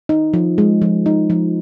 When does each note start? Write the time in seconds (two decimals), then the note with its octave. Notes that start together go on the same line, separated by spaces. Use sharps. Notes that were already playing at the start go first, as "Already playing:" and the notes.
0.09 D#4
0.33 F3
0.58 G#3
0.82 F3
1.06 D#4
1.30 F3